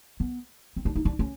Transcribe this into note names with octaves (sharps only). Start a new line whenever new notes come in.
B3
C4
D4
D#4
D4
C#4